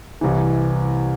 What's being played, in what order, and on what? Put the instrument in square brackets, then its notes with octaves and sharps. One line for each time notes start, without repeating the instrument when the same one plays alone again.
[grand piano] C2 C3 E3